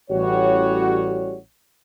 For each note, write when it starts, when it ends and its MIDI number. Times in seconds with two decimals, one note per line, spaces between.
0.11 1.37 33
0.11 1.37 55
0.11 1.37 66
0.11 1.37 73